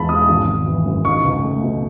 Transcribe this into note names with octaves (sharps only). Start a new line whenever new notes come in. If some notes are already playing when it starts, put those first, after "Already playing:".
Already playing: E2 G#3 D#4 A5 B5
B2 D#6
G#1
G#1
E3
F#2
D#4 C#6
C#2
A3
B2